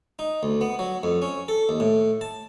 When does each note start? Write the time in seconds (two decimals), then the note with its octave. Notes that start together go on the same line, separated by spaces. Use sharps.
0.19 D#4
0.43 D2
0.61 B3
0.79 F#3
1.03 F2
1.22 C#4
1.48 A4
1.69 D#2
1.80 A2
2.21 A5